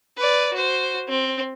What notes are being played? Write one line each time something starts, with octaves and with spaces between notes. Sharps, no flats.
B4 D5
F#4 C5
C4